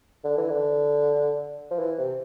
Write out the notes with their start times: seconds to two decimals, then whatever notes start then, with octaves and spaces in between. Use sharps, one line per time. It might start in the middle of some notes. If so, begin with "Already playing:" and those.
0.24 D3
0.37 E3
0.50 D3
1.71 F3
1.79 E3
1.98 C3